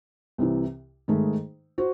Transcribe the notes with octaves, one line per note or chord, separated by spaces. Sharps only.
C2 C3 E3
G#2 D#3 A3 D#4 G#4
F#4 C5